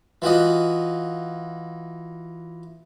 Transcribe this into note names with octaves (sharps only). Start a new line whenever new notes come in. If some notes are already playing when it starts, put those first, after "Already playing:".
E3 F4 F#4 D#5